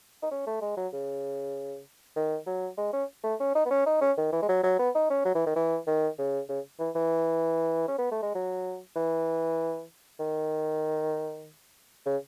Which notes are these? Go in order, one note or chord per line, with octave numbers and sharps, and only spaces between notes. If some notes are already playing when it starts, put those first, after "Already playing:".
D#4
C#4
A3
G#3
F#3
C#3
D#3
F#3
G#3
C#4
A3
C#4
D#4
B3
C#4
D#4
C#4
D#3
E3
G#3
F#3
F#3
B3
D#4
C#4
F#3
E3
D#3
E3
D#3
C#3
C#3
E3
E3
C#4
B3
A3
G#3
F#3
E3
D#3
C#3